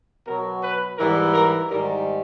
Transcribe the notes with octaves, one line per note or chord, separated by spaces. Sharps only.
B2 F#3 A#4
B4
G#2 E3 G3 A#4
A#4
G#2 D#3 G3 A#4